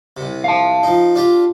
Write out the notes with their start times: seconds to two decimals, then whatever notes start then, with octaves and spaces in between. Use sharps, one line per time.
0.17 C2 C3
0.44 F5 A5
0.83 F3 D#4
1.15 D4 F4 G4